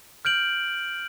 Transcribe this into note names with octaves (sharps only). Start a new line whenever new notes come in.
F6 G6 D7 F#7